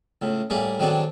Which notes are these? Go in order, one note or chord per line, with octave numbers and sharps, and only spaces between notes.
C#2 A2
A2 G3 A#3 G#4
D#3 F#3 G#3 C4 D4 A4